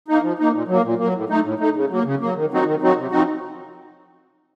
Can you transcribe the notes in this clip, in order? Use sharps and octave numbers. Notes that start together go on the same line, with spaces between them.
A#3 D#4
F3
A#3 D#4
A#2
F#3 A#3
A#2
A#3
F#3
A2
A3 D#4
A2
A3 D#4
C#3
F#3 A#3
C#3
F#3 A#3
D#3
F#3 C4 D#4 F#4
D#3
F#3 C4 D#4 F#4
C3
F3 C4 D#4 F#4